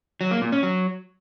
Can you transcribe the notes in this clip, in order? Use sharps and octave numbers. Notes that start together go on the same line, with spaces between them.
F#3
A#3
A#2
C#4
F#3